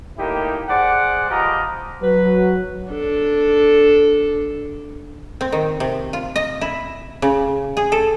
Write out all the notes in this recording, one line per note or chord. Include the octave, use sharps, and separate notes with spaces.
A2 A#3 D#4 E4 G4
G#4 C5 D5 F#5
F3 F4 G4 B4 D#5 A#5
F#3 B4
D4 A4
C4
D#3
C3
F4
D#5
E4
C#3
G#4
A4